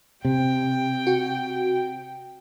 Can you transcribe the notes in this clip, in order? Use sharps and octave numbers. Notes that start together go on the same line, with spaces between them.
C3 G5
F#4